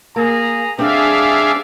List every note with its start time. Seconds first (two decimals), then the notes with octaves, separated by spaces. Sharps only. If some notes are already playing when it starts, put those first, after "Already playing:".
0.16 A#3 G#4 A#5
0.79 G3 C4 D4 G#4 A4 D5 E5 F5